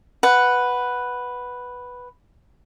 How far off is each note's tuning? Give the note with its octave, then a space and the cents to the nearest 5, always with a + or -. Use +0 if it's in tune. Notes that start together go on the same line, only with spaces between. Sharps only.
B4 +0 F#5 +0